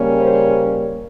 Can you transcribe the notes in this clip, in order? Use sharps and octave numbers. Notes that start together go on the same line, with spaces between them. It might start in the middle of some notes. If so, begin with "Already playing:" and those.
Already playing: C#3 G3 A#3 C#4
C5